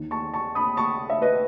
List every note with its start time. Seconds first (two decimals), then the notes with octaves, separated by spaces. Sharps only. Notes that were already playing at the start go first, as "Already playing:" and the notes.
Already playing: D#2 D#3
0.11 A5 C#6
0.34 A5 C#6
0.55 B5 D#6
0.77 A5 C#6
1.10 E5
1.22 B4 D#5